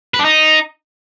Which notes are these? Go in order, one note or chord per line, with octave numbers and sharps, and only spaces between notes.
B4
D4
D#4